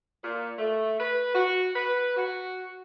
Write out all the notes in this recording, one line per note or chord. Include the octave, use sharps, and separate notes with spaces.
A#2
A3
B4
F#4
B4
F#4